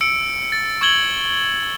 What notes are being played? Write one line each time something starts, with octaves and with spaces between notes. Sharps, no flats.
E6 C#7 D7
A6
C#6 E6 G#6 F#7 G7